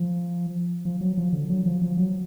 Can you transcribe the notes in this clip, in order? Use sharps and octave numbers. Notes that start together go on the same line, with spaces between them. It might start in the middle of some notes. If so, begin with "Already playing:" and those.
Already playing: F3
F3
F#3
F3
D3
F#3
F3
F3
F#3